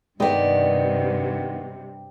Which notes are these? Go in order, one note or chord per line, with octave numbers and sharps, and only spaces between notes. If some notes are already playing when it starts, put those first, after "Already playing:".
G2 C3 D#3 B3 D5 D#5 G5